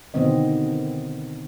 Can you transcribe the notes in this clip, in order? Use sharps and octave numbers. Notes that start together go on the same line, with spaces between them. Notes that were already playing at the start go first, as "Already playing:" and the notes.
B2 D3 D#3 B3 C4 D#5